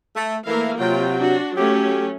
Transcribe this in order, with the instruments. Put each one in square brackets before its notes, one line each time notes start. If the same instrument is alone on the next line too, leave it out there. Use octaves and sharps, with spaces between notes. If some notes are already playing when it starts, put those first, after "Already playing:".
[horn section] A3
[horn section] E3 A3 E4 [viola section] A#3 A#4 F5
[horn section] C3 F#3 [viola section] F4 G5
[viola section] D4 F#4
[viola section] F#3 A3 C#4 [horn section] G4